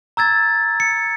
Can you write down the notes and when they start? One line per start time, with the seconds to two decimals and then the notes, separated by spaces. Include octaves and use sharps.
0.17 A#5 E6 G#6 A6
0.80 C#7